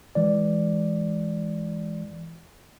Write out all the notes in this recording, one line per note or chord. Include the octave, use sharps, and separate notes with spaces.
E3 G#3 D5